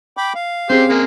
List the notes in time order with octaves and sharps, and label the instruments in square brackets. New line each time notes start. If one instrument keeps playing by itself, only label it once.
[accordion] G5 B5 D6
F5
[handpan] C4 C#4 G#4 [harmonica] G4 C5
[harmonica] G#3 A#3